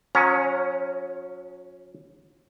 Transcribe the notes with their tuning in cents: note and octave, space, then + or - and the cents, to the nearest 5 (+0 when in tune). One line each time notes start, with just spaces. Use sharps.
F#3 -45 C#4 +0 A#5 +0